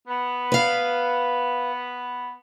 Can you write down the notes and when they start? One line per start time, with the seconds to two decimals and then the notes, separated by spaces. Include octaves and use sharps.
0.08 B3
0.52 B4 F5